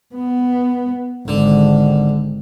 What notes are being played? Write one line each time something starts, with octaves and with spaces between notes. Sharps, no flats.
B3
G#1 D3